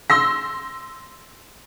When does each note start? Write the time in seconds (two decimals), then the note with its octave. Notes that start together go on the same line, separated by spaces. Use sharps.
0.10 C6 E6 A#6